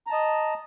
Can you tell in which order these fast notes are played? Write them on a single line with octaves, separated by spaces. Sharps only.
A#5 A5 D#5